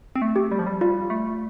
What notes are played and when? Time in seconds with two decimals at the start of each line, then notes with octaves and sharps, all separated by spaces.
0.16 C4
0.22 A3
0.36 G4
0.52 G3
0.59 F3
0.67 G3
0.81 G3 F4
1.10 A3